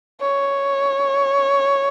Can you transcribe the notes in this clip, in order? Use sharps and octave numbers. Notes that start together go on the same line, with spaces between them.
C#5